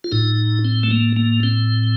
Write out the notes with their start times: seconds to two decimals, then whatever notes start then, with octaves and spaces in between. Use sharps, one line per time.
0.04 F4
0.12 A2 D#4
0.65 C4
0.83 A3
0.91 A#3
1.17 A#3
1.43 C4